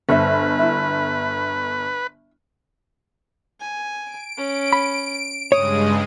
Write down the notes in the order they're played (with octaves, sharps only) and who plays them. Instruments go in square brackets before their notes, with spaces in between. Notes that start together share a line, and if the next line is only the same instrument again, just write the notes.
[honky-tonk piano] G1 [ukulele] A4 C5 E5 [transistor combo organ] B4
[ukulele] E4 E5
[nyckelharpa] G#5
[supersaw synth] D7
[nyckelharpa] C#4
[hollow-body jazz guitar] B5
[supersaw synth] G2 C#3 G#3 [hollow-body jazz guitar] C#5 [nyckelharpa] D#6